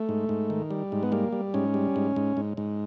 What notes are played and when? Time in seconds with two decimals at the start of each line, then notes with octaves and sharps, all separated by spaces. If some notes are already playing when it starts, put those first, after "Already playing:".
Already playing: A3
0.09 G#2
0.29 G#2
0.50 D#3
0.71 G3
0.92 G#2
1.03 B3
1.12 G3 A#3
1.33 G3
1.54 G#2 C#4
1.74 G3
1.96 G#2
2.16 G#2
2.37 G#2
2.57 G#2